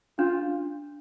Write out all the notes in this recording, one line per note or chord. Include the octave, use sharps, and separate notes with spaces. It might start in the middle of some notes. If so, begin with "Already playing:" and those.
D4 F4